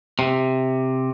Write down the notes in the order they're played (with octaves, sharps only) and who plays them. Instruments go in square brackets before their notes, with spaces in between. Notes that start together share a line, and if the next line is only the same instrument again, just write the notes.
[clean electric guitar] C3